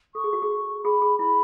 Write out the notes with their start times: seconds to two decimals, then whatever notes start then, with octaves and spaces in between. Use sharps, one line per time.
0.15 A4 C#6
0.24 G#4
0.33 F#4
0.42 G#4
0.84 G#4 B5
1.02 G#4
1.19 E4 B5